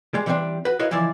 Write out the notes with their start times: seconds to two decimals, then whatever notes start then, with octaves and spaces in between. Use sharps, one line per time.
0.14 G3 G#3
0.26 D3 E3 G3 A#3 C4 D4
0.65 F#4 B4
0.79 E4 F#4 A#4 C#5 D#5 F5
0.91 C#2 E3 F3 E4 D5